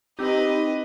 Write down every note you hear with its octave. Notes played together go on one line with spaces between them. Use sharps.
C4 D#4 G4 B4 D#5